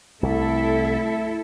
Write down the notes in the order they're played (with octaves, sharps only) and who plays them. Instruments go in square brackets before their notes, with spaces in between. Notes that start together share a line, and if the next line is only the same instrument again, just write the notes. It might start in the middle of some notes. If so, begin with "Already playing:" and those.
[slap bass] C2 [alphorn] A3 [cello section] E4 A4